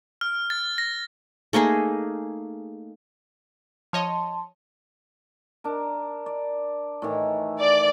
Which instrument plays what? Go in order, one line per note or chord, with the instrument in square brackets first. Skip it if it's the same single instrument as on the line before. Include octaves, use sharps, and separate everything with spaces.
[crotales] F6
A6
A#6
[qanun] A3 A#3 D#4 G#4
[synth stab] F3 C#5 D#5 [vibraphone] A5 C6
[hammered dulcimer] D4 A#4
D5
A2 D#3 E3
[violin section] D5